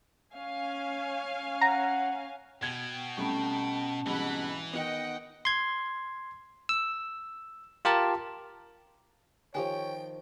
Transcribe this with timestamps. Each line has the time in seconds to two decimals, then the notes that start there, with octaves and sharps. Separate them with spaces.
0.34 C#4 F5 G#5
1.61 F#5 A#5
2.63 B2 G5 G#6
3.17 C2 A3 C#4 A5 B5
4.06 C2 G#2 B2 E3 F#5 B5
4.73 D#3 B3 D#5 F#5 G5
5.45 C6 G#6
6.69 E6
7.85 F4 G4 A#4 A5
9.55 D#3 F3 G4 C#5 G5 G#5